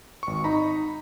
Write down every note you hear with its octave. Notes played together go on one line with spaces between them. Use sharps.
G#1 C#6
D#4 A#5 B5